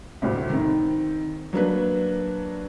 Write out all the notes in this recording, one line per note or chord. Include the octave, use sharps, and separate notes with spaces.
D2 A2 C3
D#3 C4
F#3 A#3 D4 B4